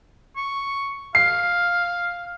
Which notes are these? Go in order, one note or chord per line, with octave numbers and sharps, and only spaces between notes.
C#6
F5 C7